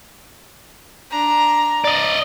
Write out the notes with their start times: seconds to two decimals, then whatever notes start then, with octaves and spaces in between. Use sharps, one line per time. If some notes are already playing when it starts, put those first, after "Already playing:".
1.11 D4 A#5
1.84 D5 D#5